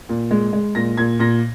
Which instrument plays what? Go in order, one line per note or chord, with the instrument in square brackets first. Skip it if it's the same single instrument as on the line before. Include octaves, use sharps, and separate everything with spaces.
[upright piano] A#2
G#3
G#3
A#2 A#6
A#2 G#6
A#2 A#6